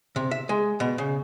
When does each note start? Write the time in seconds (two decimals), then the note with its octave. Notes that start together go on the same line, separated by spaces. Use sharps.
0.16 C3
0.31 E5
0.49 G#3
0.80 B2
0.98 C#3